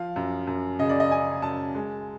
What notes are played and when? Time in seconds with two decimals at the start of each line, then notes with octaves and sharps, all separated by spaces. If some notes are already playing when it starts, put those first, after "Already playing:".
Already playing: F3 F5
0.16 F#2
0.47 F#2
0.79 C#3 D#5
0.89 D5
1.00 D#5
1.11 C#3 G#5
1.42 F#2 A5
1.75 G#3